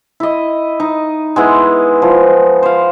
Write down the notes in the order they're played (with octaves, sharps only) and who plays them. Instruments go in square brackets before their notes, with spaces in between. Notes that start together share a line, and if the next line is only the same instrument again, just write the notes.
[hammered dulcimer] E4 D#5
D#4
G#3 B3 E4
F3
C5 F5